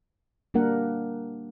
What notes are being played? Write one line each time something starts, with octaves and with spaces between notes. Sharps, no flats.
G3 A#3 D4 A#4 F#5